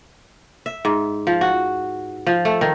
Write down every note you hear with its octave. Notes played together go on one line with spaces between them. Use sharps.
E5
G#2
F3
F#4
F3
A3
D#3